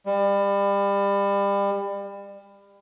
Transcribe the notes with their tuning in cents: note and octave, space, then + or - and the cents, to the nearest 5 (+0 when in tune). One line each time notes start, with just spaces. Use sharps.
G3 +30